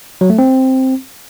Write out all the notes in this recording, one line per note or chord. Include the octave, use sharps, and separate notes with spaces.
F#3
A3
C4